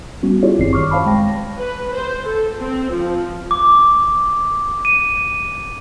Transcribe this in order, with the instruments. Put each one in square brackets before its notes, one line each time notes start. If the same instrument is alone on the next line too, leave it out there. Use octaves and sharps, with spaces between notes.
[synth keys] G3 B3 C#4 F#4
E4 F4 G4 G#4 C#5 D5
G1 F#2 D#3 C4 D5 C7
C#6 D6 F6
C5 C#5 F5 A5 B5
G#3 G5 A#6
[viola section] B4
C5
A4
C4
F3
[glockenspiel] D6
D#7